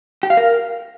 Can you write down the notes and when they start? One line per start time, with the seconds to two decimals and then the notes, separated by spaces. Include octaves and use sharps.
0.23 G4
0.30 F5
0.37 A#4